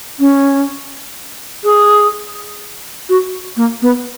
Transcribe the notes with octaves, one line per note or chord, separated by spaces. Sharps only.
C#4
G#4
F#4
A#3
B3